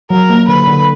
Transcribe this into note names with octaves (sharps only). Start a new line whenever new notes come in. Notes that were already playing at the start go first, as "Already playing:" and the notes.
F#3 A#4
A#3
D3 B4
D3